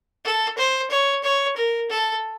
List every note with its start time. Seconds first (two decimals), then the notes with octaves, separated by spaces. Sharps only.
0.24 A4
0.57 C5
0.90 C#5
1.23 C#5
1.56 A#4
1.90 A4